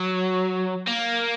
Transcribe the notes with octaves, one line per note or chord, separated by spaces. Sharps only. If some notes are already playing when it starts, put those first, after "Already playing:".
Already playing: F#3
A#3